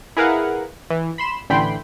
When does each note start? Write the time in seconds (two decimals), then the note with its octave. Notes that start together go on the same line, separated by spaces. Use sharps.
0.17 E4 G#4 A#4 B4 F5 F#5
0.90 E3
1.18 B5 C6 E7
1.49 A1 D3 E3 G5 B5 C6